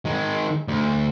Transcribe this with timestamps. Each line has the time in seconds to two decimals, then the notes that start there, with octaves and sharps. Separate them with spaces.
0.05 D#3 G#3
0.68 D2